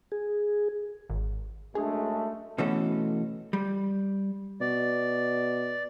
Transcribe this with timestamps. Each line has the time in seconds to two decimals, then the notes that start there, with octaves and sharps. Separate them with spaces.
0.12 G#4
1.09 G#1
1.75 F#2 G#3 A3 D4 G#4
2.58 B2 E3 A3 C#4 F#4 A4
3.53 G3
4.61 B2 D5